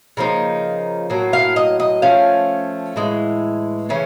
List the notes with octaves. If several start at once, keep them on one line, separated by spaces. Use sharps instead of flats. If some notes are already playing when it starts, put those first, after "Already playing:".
C#3 F3 A#3 D#4
A2 F#3 A#3
F5
D#5
D#5
F3 A3 C#4 F5
A2 E3 G#3
C#3 E3 A3 C#4